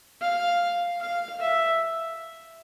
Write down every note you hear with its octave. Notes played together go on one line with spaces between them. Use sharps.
F5
F5
E5